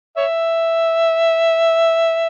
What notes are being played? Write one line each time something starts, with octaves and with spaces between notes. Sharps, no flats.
C#5 E5